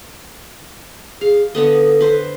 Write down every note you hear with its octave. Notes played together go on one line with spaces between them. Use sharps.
G#4 F5
D3 B3 A4 D#5
B4 C5